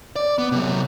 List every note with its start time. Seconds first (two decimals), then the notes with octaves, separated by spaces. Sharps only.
0.16 D5
0.38 B3
0.52 C3 F#3